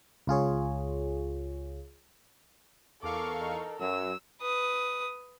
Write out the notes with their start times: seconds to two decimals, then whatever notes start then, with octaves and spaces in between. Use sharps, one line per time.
0.27 C#2 F4 G#4 C#5
3.03 E2 A4 A#4 F5 C#6 D6
3.38 D#4
3.80 F#2 F#3 E6
4.41 B4 D#6